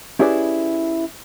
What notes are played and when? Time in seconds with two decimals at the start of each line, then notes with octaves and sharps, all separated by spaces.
0.19 C#4 E4 G4 G#4 B4 D5